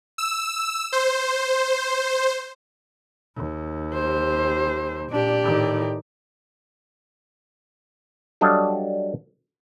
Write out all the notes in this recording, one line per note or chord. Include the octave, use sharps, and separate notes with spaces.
E6
C5
D#2
G4 C5
A#2 D4 G4 D5
A2 D#3
F#3 G3 D4 A4 D#5 F5